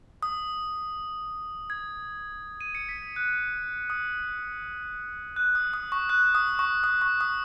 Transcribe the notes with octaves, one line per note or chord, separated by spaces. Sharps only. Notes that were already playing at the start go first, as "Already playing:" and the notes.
D#6
G#6
D#7
C#7
B6
G#6
F#6
D#6
F#6
D#6
D#6
C#6
F#6
D#6
C#6
D#6
C#6
D#6